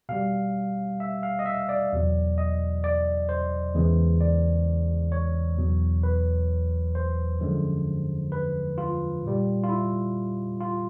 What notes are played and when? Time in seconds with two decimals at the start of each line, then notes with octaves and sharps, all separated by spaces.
0.09 B2 G3 F5
1.00 E5
1.23 F5
1.39 D#5
1.46 E5
1.69 D5
1.92 E2 B2 F#3
2.38 D#5
2.84 D5
3.29 C5
3.75 E2 C#3 E3 G#3
4.21 D5
5.12 C#5
5.58 E2 B2 F#3
6.03 B4
6.95 C5
7.40 F#2 D3 F3 G#3
8.32 B4
8.78 F4
9.24 A#2 G3
9.63 F4
9.69 E4
10.60 F4